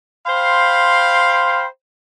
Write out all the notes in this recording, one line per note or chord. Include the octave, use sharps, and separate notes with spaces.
C5 F5 G5 B5 C6